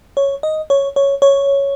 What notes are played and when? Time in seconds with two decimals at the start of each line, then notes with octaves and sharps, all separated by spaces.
0.17 C#5
0.43 D#5
0.70 C#5
0.96 C#5
1.22 C#5